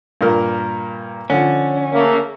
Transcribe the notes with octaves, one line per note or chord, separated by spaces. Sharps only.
G2 A#2 A#4
D3 F3 C#4
C#3 A3 A#3